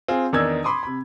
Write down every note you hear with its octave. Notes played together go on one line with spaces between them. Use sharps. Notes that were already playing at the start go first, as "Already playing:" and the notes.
C4 F4 G#4
E2 D#3 D4 D#4 E6 G#6
B5 C6 D6 D#6
C3 B5